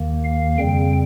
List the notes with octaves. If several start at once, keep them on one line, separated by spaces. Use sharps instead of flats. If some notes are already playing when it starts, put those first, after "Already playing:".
Already playing: D#2 D#3 A#3
F5
F2 C#3 G3 C4 G5